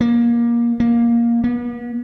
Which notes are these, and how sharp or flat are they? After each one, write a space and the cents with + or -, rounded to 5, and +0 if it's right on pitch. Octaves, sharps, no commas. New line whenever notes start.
A#3 +20
A#3 +10
B3 -40